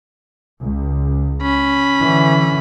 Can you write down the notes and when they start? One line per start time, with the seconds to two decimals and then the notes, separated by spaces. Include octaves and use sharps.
0.61 C#2
1.42 C#4 B5
2.01 D3 E3